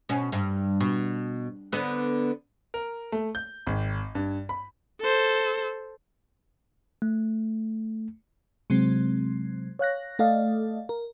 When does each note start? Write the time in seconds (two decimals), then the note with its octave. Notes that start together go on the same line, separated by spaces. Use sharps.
0.09 B2 C#4
0.32 G2
0.80 B2
1.72 D3 B3 B4
2.74 A#4
3.12 A3
3.35 G6
3.67 G#1
4.15 G2
4.49 B5
5.00 A4 C5
7.02 A3
8.70 C3 F#3 G#3 C4
9.79 C#5 F5 F#6 A#6
10.19 A3 A4 D5 D#5 F5
10.89 A#4